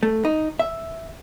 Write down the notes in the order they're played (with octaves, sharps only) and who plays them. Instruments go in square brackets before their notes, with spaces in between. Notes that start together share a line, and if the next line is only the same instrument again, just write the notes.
[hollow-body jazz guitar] A3
D#4
E5